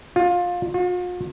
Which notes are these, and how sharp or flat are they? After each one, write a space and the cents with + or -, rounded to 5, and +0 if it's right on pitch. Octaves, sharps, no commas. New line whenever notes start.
F4 +20
F4 +45